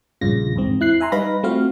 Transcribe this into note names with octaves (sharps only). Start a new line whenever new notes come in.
A#1 G2 C#3 F4 A#6
E2 G#2 C4
E4 F#6 C7
E5 G#5 A#5 C6
G3 D#4 B4 F5 B5 A#6
A3 C4 F4 F#4 F5